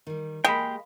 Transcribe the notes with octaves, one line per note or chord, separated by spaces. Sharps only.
D#3 G3
G#3 A#3 G4 G#4 F5 G5 B5